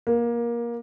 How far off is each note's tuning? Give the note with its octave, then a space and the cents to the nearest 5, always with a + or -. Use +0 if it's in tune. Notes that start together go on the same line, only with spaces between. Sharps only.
A#3 +20